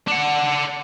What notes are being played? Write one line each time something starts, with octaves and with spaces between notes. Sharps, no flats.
D4 F#5